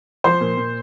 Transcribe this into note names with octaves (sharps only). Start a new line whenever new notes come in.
F3 C5 C6
A#2
A#2